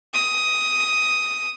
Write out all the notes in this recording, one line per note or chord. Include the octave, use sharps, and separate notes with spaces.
D#6